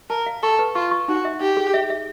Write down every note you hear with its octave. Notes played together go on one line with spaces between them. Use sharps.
A#4 A5
F5
A4 C#6
B4
F4 C#6
C#6
D#4 F#4
E5
D#4 G4
G#4
E5
E5